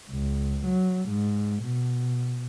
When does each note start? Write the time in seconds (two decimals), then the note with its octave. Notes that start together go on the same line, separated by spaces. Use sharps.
0.10 C#2
0.65 F#3
1.08 G#2
1.63 B2